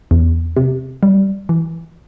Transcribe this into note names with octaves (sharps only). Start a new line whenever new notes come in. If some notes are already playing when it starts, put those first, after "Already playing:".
E2
C3
G3
E3